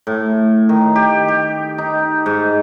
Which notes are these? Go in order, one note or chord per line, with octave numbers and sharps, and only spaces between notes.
A2
D#3
G4
G4
D#4
G#2